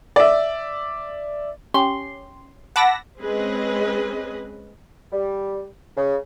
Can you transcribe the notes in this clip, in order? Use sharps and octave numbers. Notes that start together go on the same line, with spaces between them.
D5 E5
C#4 G4 C6
F#5 A5 B5 D6 E6 A#6
G#3 C4 C#4 G#4 B4 D#5
G3
C#3